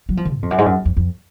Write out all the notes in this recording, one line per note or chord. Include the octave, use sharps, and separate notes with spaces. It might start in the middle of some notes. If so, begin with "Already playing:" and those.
F#3
F3
D#3
G#2
F2
F#2
G#2
F#2
F2
F2